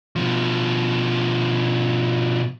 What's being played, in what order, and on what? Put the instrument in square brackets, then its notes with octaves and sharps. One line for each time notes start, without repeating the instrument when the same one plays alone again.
[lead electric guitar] B2 F3